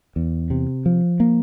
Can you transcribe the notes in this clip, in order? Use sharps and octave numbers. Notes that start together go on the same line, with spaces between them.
E2
C3
F3
A#3